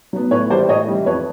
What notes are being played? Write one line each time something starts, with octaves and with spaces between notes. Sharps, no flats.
F#3 B3
A2 B4 C#5
E3 G3 C5 D5
A2 C#5 D#5
E3 G3
F2 B4 C#5